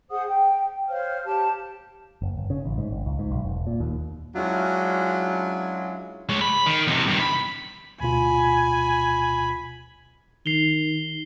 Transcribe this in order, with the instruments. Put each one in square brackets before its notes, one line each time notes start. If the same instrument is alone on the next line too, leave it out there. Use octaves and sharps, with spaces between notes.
[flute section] G#4 C5 F#5 D#6
G5
C5 C#5 F5 F6
G4 A5
[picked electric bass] F#1
G1
C#3
A1
G#2
G#1
C#2
G#2
B1
E1
A#2
D#2
[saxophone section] F#3 G#3 C#4 D4 E4 F4
[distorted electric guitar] G#3 C#5
B5
D#3
E2 C3
G2 D#3
B5
[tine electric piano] D2 B2 F4 [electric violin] G#5 [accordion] B5
[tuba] D#3 [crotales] C7 F7 G7